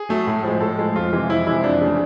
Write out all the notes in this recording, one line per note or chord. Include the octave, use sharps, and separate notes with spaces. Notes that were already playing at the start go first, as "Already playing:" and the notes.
Already playing: G#4
F#3 A3
A2
F3 G#3
A2 A4
F3 G#3
F2 F4
C3 E3 G#3
F2 E4
C3 E3 G#3 E4
F2 D4
C#3 E3 A3